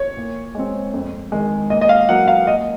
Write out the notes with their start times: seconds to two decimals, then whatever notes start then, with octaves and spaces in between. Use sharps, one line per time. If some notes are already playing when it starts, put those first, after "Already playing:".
Already playing: C#5
0.17 A#2
0.55 G#3 C4
0.94 F2
1.32 D#3 G#3
1.70 A#2 D#5
1.81 D#5
1.89 F5
2.09 F#3 A#3 F#5
2.28 F5
2.47 A#2 D#5